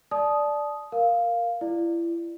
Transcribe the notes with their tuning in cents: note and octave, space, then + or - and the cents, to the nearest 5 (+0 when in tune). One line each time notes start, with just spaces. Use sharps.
D5 +0 A5 -30 D#6 +0
A#4 +0 F5 +0
E4 +35 D5 +25